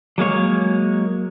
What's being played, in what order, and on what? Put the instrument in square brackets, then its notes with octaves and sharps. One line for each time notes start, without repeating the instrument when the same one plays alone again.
[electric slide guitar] F#3 G#3 A#3 C#5